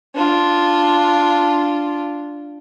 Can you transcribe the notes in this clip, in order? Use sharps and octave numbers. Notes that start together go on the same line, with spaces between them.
D4 F4